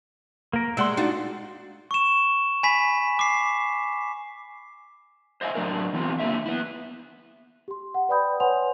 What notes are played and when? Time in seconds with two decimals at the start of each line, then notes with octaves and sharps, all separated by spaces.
0.53 A#3 A#4
0.77 G3 G#3 E5 F#5 C6
0.97 D4 D#4 F4 F#4 D5
1.91 C#6 E7
2.63 G#5 B5 B6
3.19 D6 C7
5.41 C5 D#5 E5 G#5
5.55 A2 D3 F#3 B3 D4 A#4
5.93 E3 B3 C4 F4 G4
6.19 F#2 D3 A#3 E5
6.46 B3 E4
7.68 G4 C6
7.94 F#5
8.09 B4 D5 G5 B5 D#6 G6
8.40 B4 C#5 F#5 G#5 C6 F7